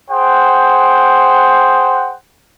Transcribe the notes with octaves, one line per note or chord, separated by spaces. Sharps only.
G#4 C5 F#5 G5